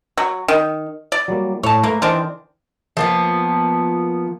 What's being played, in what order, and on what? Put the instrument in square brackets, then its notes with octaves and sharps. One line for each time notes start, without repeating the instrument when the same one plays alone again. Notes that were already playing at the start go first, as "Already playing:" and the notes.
[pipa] F#3
D#3
D5
[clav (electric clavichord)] F#3 G3 A#3
[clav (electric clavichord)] A2 [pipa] C#5 A5
[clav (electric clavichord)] A3 B4 [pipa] A#3
[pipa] D#3 C4 D4 [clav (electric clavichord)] E3
[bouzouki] F3 A#3 B3